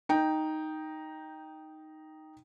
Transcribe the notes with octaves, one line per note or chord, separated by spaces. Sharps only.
D#4 G5